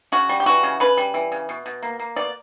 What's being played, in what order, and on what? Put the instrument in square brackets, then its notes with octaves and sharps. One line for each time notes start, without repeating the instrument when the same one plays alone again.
[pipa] C#3 F#4
G3
G4
E3 F#4
C#3
C#3 B4
G3
E3
C#3
B2
B2
A#3
A#3
B2 D5